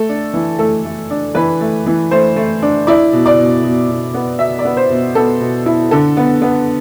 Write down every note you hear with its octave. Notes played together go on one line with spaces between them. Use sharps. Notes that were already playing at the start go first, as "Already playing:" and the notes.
Already playing: A3 A4
D4
E3
A3 A4
A3
D4
E3 B4
A3
E3
A3 C5
A3
D4
E4 D5
B2
D5
B2
B2
B2
B3
B2 E5
D5
B3
C5
B2
B3 A4
B2
E4
D3 A4
B3
B3